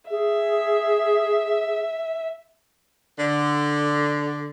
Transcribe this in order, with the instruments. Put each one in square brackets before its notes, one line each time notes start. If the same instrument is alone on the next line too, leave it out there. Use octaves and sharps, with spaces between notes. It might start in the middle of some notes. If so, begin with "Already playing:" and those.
[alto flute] G#4 [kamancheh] E5
[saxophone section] D3